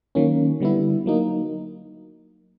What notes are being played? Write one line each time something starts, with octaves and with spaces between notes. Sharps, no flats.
D#3 F#3 A#3 C#4
D3 G3 B3 E4
F#3 A#3 D#4